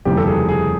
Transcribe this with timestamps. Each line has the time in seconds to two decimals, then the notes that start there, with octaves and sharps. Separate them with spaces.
0.05 F1 D#2 C#3 E3 G3 G4
0.17 A4
0.27 G#4
0.49 G#4